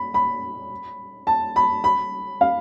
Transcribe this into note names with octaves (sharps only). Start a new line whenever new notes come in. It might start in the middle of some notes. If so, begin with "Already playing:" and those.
Already playing: B5
B5
A5
B5
B5
F5